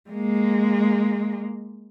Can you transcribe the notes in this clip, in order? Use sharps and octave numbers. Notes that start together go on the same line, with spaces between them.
G#3 A#3